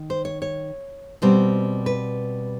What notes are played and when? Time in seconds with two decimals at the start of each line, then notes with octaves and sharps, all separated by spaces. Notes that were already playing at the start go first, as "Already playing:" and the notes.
Already playing: D#3
0.10 C5
0.25 C#5
0.42 C#5
1.22 B2 G3 C4 C5
1.86 B4